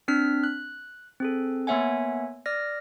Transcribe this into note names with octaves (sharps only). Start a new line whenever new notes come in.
C4 D4 F6 B6
F#6
C4 G#4 A4
A#3 B3 C#5 E5 F#5 G#5
D5 F6 A#6